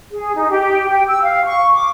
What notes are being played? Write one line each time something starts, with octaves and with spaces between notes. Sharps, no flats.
G#4
D#4
G4
G5
E6
F5
C#6
D6